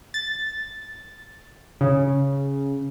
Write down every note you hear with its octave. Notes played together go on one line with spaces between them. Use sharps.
A6
C#3